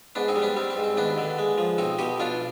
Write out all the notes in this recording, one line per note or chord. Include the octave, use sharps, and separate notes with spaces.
G#2 B3 D4
C4 D#4
G3
B3 D4
G3 C4
C4
G#2
C4
D#2 B3 D4
D3
G#3
F3
B1 C4 D#4
B2 D#4 G4
B1 D4 F4